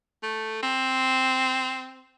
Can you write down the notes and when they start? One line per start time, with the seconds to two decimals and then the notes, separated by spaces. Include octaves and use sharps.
0.23 A3
0.63 C4